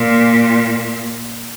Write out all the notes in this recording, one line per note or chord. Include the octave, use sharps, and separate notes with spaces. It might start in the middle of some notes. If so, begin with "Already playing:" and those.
Already playing: A#2